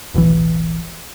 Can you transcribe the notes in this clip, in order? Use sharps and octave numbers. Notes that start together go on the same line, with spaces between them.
E1 B1 A2 E3